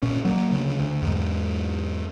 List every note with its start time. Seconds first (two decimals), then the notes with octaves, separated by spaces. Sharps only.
0.02 A#2 C#4
0.25 F#3 A#3
0.51 D2 C#3
0.79 D2
1.02 E2 G#2